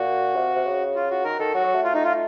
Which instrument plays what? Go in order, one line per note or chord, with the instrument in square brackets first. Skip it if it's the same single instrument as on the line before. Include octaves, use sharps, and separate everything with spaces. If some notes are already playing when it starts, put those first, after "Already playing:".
Already playing: [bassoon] A#2 [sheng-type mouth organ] F#4
[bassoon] C3
C3
C#3
[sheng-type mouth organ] F4
F#4
[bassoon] D#3 [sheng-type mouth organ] A#4
[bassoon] D#3 [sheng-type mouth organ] A4
[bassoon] F#3 [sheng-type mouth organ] F#4
[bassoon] F#3
A3
[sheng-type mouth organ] F4
D#4
F4